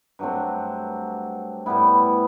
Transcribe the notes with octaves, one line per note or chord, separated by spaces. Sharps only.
G2 F#3 A3 C4
A2 G3 B3 E4